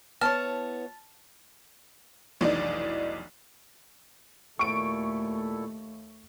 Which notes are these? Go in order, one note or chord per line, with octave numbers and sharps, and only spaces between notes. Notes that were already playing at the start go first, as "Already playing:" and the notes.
B3 E4 C#5 A5 F6
F1 B1 E3 D4 D#4 D5
D#2 A#2 A3 E4 A4 C#6 D7